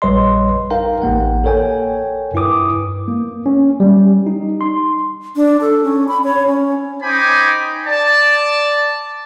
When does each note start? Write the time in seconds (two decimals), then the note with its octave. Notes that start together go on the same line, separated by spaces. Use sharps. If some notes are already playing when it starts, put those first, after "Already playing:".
0.02 A#1 G3 B4 C#5 D#5 C6
0.70 D#4 A#4 F5 G5 A#5
1.02 A1 A#3 F#5
1.44 A4 A#4 C#5 G5 G#5
2.34 G2 E4 B4 D6 D#6
3.08 A#3
3.46 C#4
3.80 G3
4.27 D#4
4.61 C6
5.36 D4
5.61 A4
5.83 C#4
6.08 B5
6.24 C#5
6.47 C#4
7.02 D#4 C5 G5 G#5 B5 D6
7.87 D5 A5